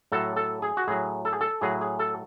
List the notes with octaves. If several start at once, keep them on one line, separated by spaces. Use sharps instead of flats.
A2 F#3 A4
A4
G#4
F#4
A2 F#3 G#4
A4
G#4
A4
A2 F#3 G#4
G#4
A4